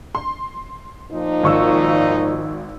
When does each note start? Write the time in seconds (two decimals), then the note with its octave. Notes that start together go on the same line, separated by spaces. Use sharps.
0.15 C6
1.11 A#2 F3 D#4
1.43 G#1 C#6 E6